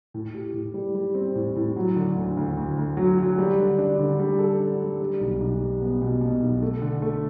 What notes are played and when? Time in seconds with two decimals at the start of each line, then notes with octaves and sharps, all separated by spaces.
0.14 A2
0.34 G4
0.54 A2
0.74 G3
0.95 G3
1.15 C4
1.35 A2
1.56 A2
1.76 F#3
1.96 D3
2.16 D2
2.37 D2
2.57 D2
2.77 D2
2.97 F#3
3.18 F#3
3.38 G3
3.58 D3
3.79 D4
3.99 D3
4.20 G3
4.39 A4
4.60 D4
4.80 G3
5.00 G3
5.21 B1
5.40 B1
5.61 G3
5.82 B3
6.02 B2
6.21 B2
6.42 B1
6.62 A3
6.82 D3
7.02 A3